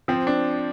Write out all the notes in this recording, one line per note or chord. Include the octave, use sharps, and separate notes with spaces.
F3 C4
D4